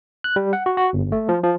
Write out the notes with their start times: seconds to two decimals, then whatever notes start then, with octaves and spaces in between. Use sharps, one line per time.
0.24 F#6
0.36 G3
0.53 F#5
0.66 F#4
0.77 F#4
0.93 G1
1.12 A3
1.29 F3
1.44 F3